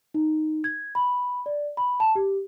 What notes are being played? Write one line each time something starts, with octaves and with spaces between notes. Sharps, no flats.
D#4
G#6
B5
D5
B5
A5
G4